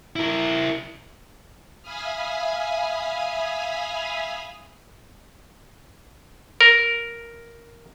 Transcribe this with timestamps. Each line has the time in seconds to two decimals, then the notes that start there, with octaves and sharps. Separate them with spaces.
0.16 E4 A#4
1.82 E5 F5 G#5 B5 D#6 F6
6.61 A#4